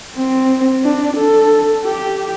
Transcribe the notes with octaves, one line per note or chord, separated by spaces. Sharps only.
C4
D4
A4
G4